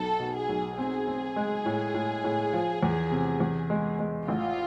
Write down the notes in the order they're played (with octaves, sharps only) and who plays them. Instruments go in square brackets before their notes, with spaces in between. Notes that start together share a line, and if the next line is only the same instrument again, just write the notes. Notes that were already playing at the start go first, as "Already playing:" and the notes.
Already playing: [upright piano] B1 [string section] A4
[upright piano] B2
[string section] G#4
[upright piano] B1
[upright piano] C4 [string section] G#4
[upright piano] C4
G#3
A2
A2
A2
F3
E2
C3
E2
G#3
G#3
[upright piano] A1 [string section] F4